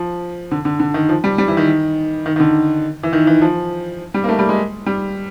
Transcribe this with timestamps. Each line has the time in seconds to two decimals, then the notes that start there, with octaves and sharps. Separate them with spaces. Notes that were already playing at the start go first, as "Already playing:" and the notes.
Already playing: F3
0.51 D3
0.65 D3
0.80 D3
0.94 D#3
1.09 F3
1.24 G3
1.38 G3
1.48 E3
1.57 D#3
2.26 D#3
2.36 D#3
2.40 D3
3.03 E3
3.13 D#3
3.27 E3
3.42 F3
4.14 G3
4.24 A#3
4.29 A3
4.39 G3
4.49 G#3
4.86 G3